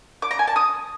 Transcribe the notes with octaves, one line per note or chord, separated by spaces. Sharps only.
D6
A#5
G#5
A5
D#6